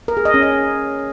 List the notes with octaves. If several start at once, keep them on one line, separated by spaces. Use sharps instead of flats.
A#4
G#4
D#5
C#4
D#5